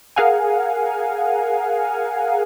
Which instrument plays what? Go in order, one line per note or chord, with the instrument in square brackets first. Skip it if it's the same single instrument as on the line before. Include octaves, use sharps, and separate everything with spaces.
[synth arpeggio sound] G#4 A#4 F5 F#5 G#5